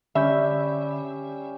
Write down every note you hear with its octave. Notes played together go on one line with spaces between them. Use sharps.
D3 G3 C#4 E5 B5 C#6 G6